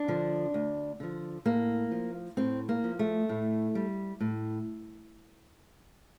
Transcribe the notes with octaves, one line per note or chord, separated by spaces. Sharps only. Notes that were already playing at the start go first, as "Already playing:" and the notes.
Already playing: D4
D3 F3
D2
D3 F3
A2 A#3
F3
A2 C4
A#3
F3
A3
A2
G3
A2